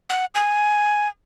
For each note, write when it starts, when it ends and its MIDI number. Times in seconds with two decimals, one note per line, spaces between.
0.10 0.25 78
0.35 1.08 80